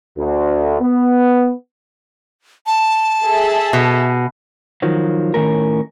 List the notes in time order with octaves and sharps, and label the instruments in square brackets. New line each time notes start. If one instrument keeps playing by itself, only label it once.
[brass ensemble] D2
B3
[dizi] A5
[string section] G#4 A4 E5
[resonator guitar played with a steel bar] B2
[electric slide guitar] D#3 F3 F#3
A2 D#3 B3 C#4 A#4